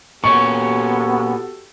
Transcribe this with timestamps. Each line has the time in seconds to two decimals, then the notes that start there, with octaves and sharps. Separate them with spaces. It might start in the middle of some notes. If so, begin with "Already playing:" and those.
0.24 A#2 B3 C#4 F#4 G4 A4 C#6